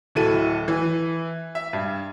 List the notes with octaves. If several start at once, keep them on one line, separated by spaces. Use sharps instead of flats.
D1 E4 F#4 A4 D#7
E3
E5
G2